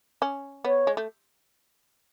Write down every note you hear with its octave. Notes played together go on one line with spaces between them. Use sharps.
C#4
B3 C#5
G#3
A3